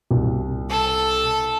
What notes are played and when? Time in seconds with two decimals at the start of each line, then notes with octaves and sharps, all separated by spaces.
0.11 C2
0.69 A4